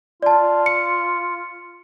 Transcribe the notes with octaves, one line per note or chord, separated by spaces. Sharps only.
F4 D5 A5
C#7